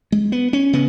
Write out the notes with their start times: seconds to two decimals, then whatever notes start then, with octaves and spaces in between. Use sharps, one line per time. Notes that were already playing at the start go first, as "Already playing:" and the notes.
0.12 G#3
0.32 B3
0.53 C#4
0.73 C#3 B3